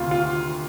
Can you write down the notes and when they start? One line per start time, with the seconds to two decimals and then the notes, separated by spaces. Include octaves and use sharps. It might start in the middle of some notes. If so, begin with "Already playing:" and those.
Already playing: D2 C3 D#3 F4
0.11 F4